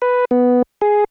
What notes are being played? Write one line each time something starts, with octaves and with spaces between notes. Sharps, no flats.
B4
B3
G#4